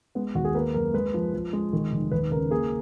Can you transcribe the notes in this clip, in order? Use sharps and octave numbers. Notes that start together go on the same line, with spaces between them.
G#3 B3
D#2 F#4
G#4
A#3 B4
F#2 A#4
G#3 B4
F3
F3
G#3
D#3
F1
D#2 B4
C#3 A#4
A#3 G#4